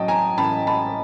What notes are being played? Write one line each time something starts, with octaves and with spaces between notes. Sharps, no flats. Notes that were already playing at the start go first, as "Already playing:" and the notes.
Already playing: A1 F#3 D#5 G5 A5
G#5 A#5
A1 A5 B5
A5 B5